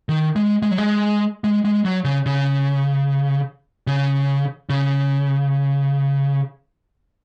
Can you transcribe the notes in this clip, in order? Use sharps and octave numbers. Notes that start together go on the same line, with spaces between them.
D#3
G#3
G#3
F#3
G#3
G#3
G#3
F#3
C#3
C#3
C#3
C#3